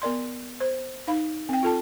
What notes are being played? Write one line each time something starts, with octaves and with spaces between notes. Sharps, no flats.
B3 A#4 D5 C6
C5
D#4 F5 B5
C4 G5
F4 A4 A5